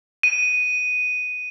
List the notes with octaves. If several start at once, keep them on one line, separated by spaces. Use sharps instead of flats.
D#7